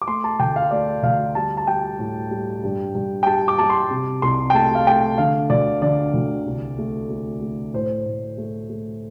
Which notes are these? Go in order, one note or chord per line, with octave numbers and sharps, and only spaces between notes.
D6
A3 C6
A5
D2 G5
F5
A3 D5
D2 F5
G3 A5
A5
G3 G5
A2
G3
G2
G2
G5
G3 A5
D6
G3 A5
C6
C3
C2 C6
G5
A3 A5
F5
A3 G5
D3 F5
D2 D5
D3 D5
D2
C2
A3
A3
A3
A2 C5
A2
A3
A3